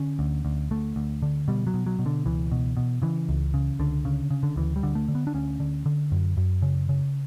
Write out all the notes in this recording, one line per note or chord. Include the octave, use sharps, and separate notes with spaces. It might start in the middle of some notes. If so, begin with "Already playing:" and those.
Already playing: D3 C#4
D2
D2
D2 A3
D2
D3
B2 G3
F#3
B2
F#3
B2
D3
C#2 E3
B2
B2
C#3 E3
C#2
C#3
C#2 D3
C#3
C#3
D3
D2 E3
G3
D3
A3
D3
B3
D4
D2 C#4
D3
D3
F#2
F#2
C#3
C#3